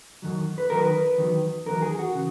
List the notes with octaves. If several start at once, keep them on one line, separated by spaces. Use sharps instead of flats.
F#2 D#3 F#3
B4
F#2 D#3 F#3 A#4
B4
E2 D#3 F#3
E2 D#3 F#3 A#4
G#4
F#4
C#3 E3